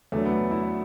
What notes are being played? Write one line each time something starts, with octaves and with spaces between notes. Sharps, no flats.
E2 D3 F#3 A3
B3
E4